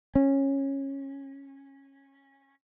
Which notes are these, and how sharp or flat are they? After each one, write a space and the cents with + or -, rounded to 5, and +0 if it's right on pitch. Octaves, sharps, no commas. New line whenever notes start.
C#4 -15